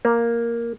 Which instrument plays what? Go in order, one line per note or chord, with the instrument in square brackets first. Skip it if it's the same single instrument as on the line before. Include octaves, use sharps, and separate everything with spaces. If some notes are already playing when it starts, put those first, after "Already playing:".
[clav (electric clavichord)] A#3